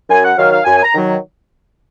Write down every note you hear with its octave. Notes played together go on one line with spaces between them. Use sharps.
F#2 G#5
F#5
D#3 F#3 F5
F5
F#2 G#5
G#5
A#5
D#3 F#3